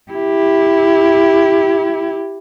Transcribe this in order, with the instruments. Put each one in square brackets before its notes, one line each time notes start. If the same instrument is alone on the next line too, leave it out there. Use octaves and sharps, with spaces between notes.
[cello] E4 G4